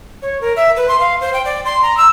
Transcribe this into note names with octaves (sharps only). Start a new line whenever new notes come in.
C#5
A#4
E5
B4
C6
F5
C5
G5
D5
C6
A#5
E6